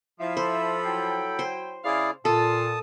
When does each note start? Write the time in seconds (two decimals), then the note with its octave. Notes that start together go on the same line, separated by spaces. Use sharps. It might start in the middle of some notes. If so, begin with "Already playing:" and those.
0.20 F3 E4 E5 F5
0.37 A4 C5 B5
0.85 F#3 E4 G5
1.39 C5
1.85 C#3 E4 G#4 D5 F5
2.25 A#2 F4 A4 A5 D#6